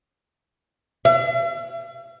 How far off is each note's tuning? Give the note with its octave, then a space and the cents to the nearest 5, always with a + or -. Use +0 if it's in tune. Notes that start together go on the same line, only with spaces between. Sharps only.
E5 +45